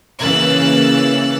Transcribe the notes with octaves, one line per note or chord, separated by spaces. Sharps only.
C#3 E3 A#3 E6 F#6 A6